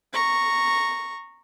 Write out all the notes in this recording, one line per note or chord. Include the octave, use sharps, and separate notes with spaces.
A#5 C#6